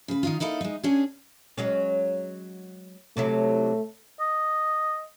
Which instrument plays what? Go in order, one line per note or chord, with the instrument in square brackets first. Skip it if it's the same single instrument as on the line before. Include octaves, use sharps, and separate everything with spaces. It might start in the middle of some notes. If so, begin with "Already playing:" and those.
[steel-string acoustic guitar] C#3 B4
D#3 D#4 F4
A#3 D#4 E4 A4 F5
G#3 D#4
C#4 D4 G4 G#4
[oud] F#3 G#3 C#4
[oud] C3 F#3 E4 [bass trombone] A3
[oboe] D#5